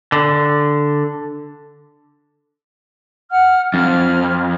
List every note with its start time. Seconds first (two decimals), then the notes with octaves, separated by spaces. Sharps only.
0.12 D3
3.31 F#5 F6
3.74 F2 F6